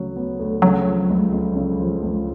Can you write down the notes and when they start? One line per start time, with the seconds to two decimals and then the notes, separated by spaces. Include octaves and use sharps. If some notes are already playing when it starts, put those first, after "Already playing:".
Already playing: D2 C#3 F#3
0.16 B3
0.39 D2
0.62 C#3 F#3
0.86 F3
1.09 C#2
1.32 C#2
1.56 C#3
1.79 F3
2.02 C#2